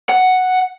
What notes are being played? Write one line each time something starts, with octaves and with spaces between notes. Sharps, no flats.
F#5